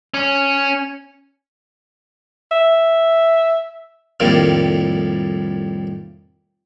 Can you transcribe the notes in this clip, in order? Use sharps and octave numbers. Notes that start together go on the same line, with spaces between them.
C#4
E5
C2 F2 A2 D#3 G3 A#3